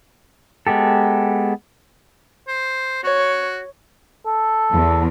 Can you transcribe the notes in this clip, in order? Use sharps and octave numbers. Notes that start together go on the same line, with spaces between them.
G#3 B3 G4 A4
C5
F#4 C#5
A4
E2